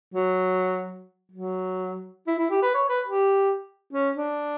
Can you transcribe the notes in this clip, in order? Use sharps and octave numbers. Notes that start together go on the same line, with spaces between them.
F#3
F#3
E4
E4
G4
B4
C#5
B4
G4
C#4
D4